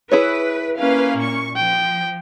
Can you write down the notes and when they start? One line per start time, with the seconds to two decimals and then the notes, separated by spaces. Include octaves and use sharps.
0.12 E4 G#4 B4 C#5
0.78 A#3 C#4 B4 F5
1.18 A#2 C#6
1.56 F3 G5